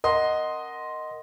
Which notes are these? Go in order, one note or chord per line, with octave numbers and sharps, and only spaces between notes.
A#4 D#5 F#5 C6